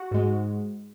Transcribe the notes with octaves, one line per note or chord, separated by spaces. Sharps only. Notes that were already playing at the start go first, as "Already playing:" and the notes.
Already playing: F#4 F#5
G#2 G#3